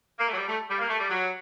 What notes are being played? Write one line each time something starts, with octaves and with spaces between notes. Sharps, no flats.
A#3
A3
F#3
G3
A3
G3
A#3
A3
G3
F#3